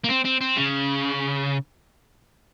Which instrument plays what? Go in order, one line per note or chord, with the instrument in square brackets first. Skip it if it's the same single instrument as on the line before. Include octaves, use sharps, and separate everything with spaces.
[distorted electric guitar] A#3
C4
C4
C4
C#3